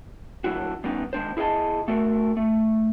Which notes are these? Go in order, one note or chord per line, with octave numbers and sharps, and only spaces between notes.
A#2 D3 F#3 E4 F#4
G3 B3 C#4 D#4
D#2 G#3 D4 C5
E4 G#4 A#4 D#5 A5
A3 F#4 A4 A#4
A3